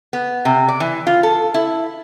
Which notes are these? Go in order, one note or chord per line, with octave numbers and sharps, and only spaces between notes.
B3
C3
D5
E3
F4
A4
E4